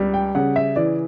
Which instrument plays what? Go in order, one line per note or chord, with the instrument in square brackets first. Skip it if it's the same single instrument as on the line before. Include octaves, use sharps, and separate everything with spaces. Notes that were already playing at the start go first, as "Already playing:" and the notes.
Already playing: [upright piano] C#2 G3
G5
C#3 F#5
E5
E3 D5